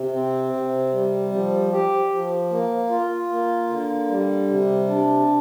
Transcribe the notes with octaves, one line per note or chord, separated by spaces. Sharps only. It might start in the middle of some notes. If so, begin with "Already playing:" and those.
Already playing: C3
C4
C3
G3
F3
G4
F3
A#3
F4
A#3
D3
G3
C3
D4